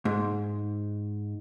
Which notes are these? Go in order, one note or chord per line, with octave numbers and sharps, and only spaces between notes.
G#2